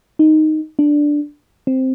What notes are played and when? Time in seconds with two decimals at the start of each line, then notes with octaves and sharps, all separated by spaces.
0.19 D#4
0.79 D4
1.67 C4